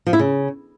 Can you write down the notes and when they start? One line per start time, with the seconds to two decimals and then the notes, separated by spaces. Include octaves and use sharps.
0.07 F3
0.13 E4
0.19 C#3